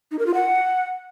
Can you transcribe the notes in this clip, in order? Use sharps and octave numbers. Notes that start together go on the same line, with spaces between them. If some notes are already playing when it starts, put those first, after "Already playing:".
D#4
A#4
F4
F#5